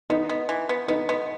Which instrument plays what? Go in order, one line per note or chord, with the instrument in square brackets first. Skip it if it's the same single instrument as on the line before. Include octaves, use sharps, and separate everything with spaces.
[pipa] B3 [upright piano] D#4
[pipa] B3
E3
B3
[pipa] B3 [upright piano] D#4
[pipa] B3